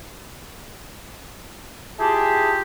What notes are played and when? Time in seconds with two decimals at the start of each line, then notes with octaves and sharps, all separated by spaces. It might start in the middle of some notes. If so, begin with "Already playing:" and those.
1.99 E4 F4 G4 G#4 A5